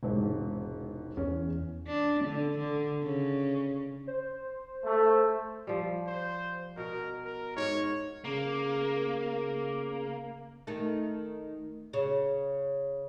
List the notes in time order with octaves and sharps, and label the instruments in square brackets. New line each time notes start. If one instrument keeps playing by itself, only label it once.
[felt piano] E1 G#2 C3
[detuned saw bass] E2 [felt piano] C#4
[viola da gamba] D4
D3
D3
C#3
[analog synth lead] C5
[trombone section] A3
[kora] F3 G3
[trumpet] C5
[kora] B2 [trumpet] A#4
[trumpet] A#4
[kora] G#2 A#4 [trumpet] C#5
[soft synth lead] C#3 [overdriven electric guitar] A#3
[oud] D#3 A3
C#3